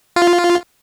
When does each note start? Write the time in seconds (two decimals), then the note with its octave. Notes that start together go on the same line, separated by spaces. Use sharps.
0.16 F4